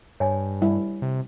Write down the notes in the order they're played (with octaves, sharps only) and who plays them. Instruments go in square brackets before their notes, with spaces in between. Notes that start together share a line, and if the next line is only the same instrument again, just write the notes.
[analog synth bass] G2 [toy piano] C#5 G#5
[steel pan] G3 E4
[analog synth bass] C3